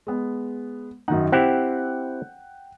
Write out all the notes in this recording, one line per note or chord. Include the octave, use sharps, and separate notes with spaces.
G#3 B3
F#2 D#3 D#4 F#5
C4 E4 G4 F#5 G5 F#6